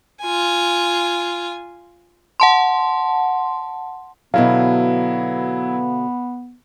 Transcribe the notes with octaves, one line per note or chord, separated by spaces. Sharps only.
F4 G#5
F#5 A5 C6
B2 D3 F#3 B3 E4 F5